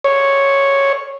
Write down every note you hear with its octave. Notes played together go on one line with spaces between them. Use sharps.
C#5